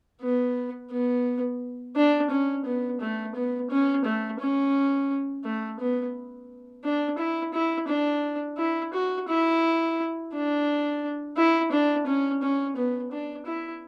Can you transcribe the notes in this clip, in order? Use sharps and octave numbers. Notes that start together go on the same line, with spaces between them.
B3
B3
D4
C#4
B3
A3
B3
C#4
A3
C#4
A3
B3
D4
E4
E4
D4
E4
F#4
E4
D4
E4
D4
C#4
C#4
B3
D4
E4